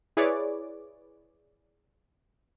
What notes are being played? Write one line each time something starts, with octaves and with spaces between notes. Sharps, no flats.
E4 G#4 B4 C#5 D5 D6